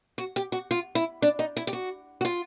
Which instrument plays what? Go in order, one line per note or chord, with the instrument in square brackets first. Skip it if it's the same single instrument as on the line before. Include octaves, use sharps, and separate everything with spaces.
[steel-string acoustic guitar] F#4
G4
F#4
F4
E4
D4
D#4
E4
G4
F#4
F#4
F4